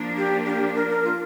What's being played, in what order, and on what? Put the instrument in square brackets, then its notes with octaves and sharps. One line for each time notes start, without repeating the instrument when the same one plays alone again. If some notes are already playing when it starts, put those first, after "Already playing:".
Already playing: [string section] F3 A#3 D4
[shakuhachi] G4
G4
A#4
A#4
F4